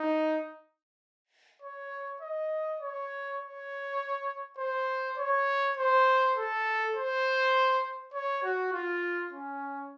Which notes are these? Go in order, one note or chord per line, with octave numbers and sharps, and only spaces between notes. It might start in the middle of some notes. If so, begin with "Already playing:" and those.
Already playing: D#4
C#5
D#5
C#5
C#5
C5
C#5
C5
A4
C5
C#5
F#4
F4
C#4